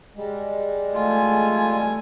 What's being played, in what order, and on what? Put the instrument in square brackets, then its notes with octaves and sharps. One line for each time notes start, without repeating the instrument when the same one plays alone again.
[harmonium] G3 G#3
[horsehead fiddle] A3 G#5 [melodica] F4